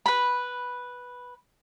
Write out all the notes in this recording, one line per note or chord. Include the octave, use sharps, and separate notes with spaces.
B4 B5